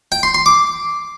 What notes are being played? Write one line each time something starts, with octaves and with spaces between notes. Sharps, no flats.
G5
C6
C6
D6